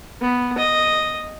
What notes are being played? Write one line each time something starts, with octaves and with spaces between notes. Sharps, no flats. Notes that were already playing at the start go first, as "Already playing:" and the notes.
B3
D#5